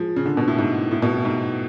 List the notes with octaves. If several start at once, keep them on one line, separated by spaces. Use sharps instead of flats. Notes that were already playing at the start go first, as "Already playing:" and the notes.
Already playing: F3 G#3
C#3
D3
B2
A2
G#2
A2
B2
A2
G#2